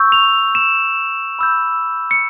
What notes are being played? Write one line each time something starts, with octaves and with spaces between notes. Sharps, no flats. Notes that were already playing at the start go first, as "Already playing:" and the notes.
Already playing: C#6 E6 G6
F7
E7
B5 E6 G6
C#7